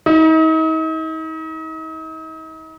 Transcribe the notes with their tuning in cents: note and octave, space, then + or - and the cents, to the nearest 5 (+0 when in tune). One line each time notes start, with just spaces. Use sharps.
D#4 +40